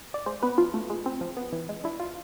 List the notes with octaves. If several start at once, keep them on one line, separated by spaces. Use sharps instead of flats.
D5
G#3 C5
B3 B4
F3 F4
A3
G#3
C4
F3
B3
E3
G#3
D4 E4
F4